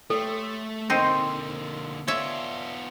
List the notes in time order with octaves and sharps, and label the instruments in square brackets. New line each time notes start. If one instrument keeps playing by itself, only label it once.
[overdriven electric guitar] A3 [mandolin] G4 C#5 C6 [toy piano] A4
[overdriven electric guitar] D3 A#3 [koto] C4 D#4 [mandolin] C5 C6 C#6
[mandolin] A3 D4 D5 [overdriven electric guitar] B3 F4 [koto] C#5 E5